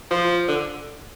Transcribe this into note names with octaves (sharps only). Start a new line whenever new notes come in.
F3
D3